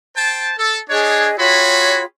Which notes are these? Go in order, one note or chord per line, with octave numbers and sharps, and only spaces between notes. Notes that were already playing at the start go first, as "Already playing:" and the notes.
C5 G5 A5
A4
D4 G#4 C#5 D#5
F4 F#4 G#4 C#5 G5 B5